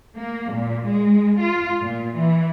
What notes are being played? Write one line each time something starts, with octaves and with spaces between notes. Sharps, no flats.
A#3
A#2
G#3
F4
A#2
E3